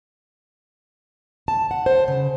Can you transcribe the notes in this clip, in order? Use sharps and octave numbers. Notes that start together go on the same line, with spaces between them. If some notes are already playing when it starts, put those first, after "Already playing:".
A5
F#5
C5
C#3